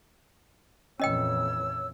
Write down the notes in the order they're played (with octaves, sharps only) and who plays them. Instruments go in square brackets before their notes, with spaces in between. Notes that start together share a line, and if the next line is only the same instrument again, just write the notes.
[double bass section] F2 A#2 E3 [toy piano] C#4 D#5 G5 [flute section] C#5 E6